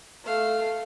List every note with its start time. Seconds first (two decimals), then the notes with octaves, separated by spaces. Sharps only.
0.24 A3 F5